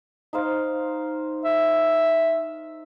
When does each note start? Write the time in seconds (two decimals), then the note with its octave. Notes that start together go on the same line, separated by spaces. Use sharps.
0.33 D#4 C5 F5
1.45 E5